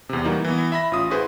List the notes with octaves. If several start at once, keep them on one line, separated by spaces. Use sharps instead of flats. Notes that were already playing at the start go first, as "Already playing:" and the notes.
E2 C3
E3 G3 A#3 D#4 F#4
E3 B3
E5 B5 A#6
A1 F4 D#6
E4 F#4 G#4 B4 C5